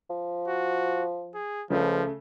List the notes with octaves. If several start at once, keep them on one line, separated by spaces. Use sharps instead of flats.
F3
F#4
G#4
C#2 C#3 F3 A3